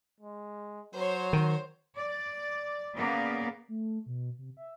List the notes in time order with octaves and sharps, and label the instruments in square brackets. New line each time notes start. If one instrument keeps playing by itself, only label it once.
[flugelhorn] G#3
[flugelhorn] F#3 [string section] C5 C#5
[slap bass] D#3
[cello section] D5
C#3 A#3 B3 D5
[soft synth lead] A3
B2
C3
E5